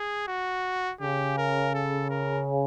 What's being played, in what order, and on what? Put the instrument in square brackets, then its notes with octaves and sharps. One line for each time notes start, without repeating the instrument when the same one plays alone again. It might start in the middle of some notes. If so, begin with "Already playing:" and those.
Already playing: [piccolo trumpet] G#4
F#4
[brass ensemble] C#3 [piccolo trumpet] G4
[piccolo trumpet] A#4
A4
A#4